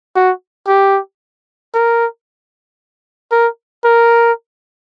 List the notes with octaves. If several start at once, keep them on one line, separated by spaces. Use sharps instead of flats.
F#4
G4
A#4
A#4
A#4